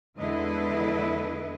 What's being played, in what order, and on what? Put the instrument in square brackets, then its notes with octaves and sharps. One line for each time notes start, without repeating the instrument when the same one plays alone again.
[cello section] E2 D3 G#3 E4 B4 D#5